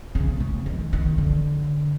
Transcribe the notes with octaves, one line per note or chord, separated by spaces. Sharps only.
C#3
C#3
D#3
D#3
D3